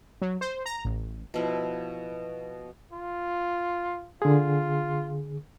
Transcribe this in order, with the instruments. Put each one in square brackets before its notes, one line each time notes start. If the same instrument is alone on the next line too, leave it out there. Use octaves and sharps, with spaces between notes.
[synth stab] F#3
C5
A#5
A1
[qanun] B2 F3 E4
[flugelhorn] F4
[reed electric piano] D3 G#4 [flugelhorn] F4